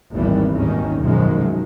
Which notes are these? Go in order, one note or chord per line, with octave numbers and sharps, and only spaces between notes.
G#1 D#2 E3 G3
G#1 D#2 A#2 D#3 C#4
B1 F#2 D#3 F3 F#3 G#3